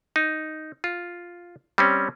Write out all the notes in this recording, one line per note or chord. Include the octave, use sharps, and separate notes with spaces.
D#4
F4
G3 C4 C#4